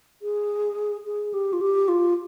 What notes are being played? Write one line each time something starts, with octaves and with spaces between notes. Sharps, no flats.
G#4
G#4
G4
F4
G4
F4